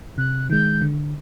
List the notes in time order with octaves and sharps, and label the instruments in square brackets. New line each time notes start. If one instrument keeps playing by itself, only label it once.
[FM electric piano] C3 [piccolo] F#6
[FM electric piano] D#3 G#3 [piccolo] G6
[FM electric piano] D3